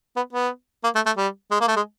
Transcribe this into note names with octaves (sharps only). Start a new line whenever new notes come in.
B3
B3
A#3
A3
A3
G3
G#3
A#3
A3
G#3